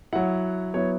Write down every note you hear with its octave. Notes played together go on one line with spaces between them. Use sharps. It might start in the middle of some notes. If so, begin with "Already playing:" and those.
F#3 E4 F#5
F#3 B3 E4 C#5